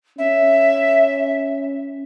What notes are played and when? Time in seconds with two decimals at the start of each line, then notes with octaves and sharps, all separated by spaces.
0.18 C#4 E5